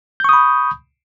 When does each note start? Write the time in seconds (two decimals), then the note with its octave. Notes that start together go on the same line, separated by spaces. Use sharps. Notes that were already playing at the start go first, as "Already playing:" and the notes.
0.20 G6
0.24 C#6
0.29 D#6
0.33 B5